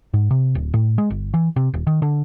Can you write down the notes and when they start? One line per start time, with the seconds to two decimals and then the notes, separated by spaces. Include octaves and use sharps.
0.14 G#2
0.31 C3
0.55 D1
0.74 A2
0.98 G#3
1.10 G1
1.34 E3
1.56 C3
1.74 D#1
1.87 D#3
2.02 D3